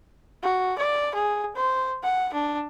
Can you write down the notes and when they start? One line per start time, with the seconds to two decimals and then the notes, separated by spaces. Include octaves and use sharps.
0.43 F#4
0.78 D5
1.15 G#4
1.56 C5
2.03 F#5
2.34 D4